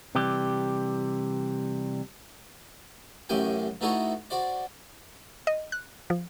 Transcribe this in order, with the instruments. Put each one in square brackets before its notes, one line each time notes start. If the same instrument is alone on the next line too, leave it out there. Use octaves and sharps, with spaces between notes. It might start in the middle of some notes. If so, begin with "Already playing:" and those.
[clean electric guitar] C3 E3 G3 G4
[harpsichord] A1 F#2 A2 G4 G5 G#5
E3 A3 D#4 F#4 A4 C#5
F#4 C5 D5
[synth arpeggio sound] D#5
F#6
F3